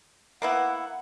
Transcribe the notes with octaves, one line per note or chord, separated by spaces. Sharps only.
A#3 B3 E4 F#5